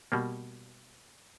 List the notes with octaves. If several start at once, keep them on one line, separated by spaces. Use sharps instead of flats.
B2 G3 A#3